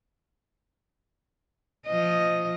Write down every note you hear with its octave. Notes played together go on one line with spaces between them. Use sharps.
F3 D#5